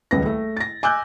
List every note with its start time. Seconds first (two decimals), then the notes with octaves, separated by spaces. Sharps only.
0.11 D#1 C#2 B4 A#6
0.26 A3
0.57 A6 A#6
0.83 G#5 D6 E6 F#6 G6